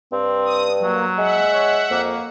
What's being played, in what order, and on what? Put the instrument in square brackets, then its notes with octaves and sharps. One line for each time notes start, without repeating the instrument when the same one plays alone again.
[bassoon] G2 [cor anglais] C4
[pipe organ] D#6
[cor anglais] F#3 [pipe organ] A#3
[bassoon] G#3 [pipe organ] E5 F#5
[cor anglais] C#5
[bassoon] F2 [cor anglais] A#3